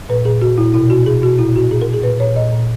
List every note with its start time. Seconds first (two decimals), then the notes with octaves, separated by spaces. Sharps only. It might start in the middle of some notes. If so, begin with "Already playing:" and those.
0.09 A#2 B4
0.25 A#2 G#4
0.41 A#2 F#4
0.58 A#2 E4
0.74 B2 E4
0.90 B2 F#4
1.06 B2 G#4
1.22 B2 F#4
1.39 A#2 E4
1.55 A#2 F#4
1.71 A#2 G#4
1.82 A#4
1.88 A#2
1.93 G#4
2.03 A#2 B4
2.20 A#2 C#5
2.36 A#2 D#5
2.53 A#2